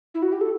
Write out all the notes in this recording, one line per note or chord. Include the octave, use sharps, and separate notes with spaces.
E4
F#4
G4
A4